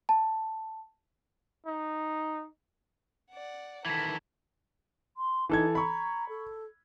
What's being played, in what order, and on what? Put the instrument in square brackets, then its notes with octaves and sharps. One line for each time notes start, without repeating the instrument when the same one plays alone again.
[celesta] A5
[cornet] D#4
[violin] D5 F#5
[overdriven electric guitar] D#3 E3 [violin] A4 [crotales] G#6 B6
[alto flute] C6
[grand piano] E3 A4 G#6 [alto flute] D#4
[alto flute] A#5 [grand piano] B5 C#6
[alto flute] A4